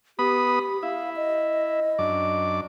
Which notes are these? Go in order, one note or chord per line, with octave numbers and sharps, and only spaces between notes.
B3 G4 B5 D#6
E4 F5
D#5
F#2 D4 D6